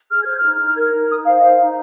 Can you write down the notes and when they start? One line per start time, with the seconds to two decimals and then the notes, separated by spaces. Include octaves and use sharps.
0.10 G#4 F6
0.23 C5 G#6
0.36 F6
0.43 D#4
0.59 D#4
0.66 F6
0.75 A#4 G#6
0.92 D#4
1.09 D#4 D#6
1.25 C5 F5
1.38 D#5
1.41 C5 F5
1.58 D#4